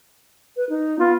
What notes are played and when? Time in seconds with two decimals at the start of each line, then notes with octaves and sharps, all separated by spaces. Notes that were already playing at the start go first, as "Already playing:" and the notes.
0.57 B4
0.69 D#4
0.99 B3 F4